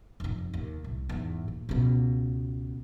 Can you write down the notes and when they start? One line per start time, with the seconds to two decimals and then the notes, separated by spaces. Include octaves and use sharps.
0.20 F1 F2
0.54 D#2
0.84 C2
1.09 E2 G#2
1.48 A#2
1.69 C#2 B2